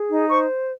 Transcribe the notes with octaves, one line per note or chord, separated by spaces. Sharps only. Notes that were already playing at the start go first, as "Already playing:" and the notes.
Already playing: G#4
D#4
C5 C#6